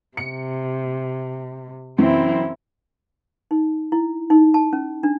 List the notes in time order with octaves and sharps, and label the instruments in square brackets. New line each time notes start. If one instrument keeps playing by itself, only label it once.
[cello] C3 [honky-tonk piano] C#7
[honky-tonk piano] F#2 C3 E3 [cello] C4 E4
[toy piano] D#4
E4
D#4
A5
C#4
D4